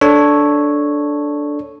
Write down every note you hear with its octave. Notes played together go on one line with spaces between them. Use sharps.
D4 A4 C#5